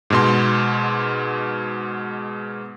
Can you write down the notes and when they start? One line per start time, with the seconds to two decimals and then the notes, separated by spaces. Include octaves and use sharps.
0.10 G#2 B2 C6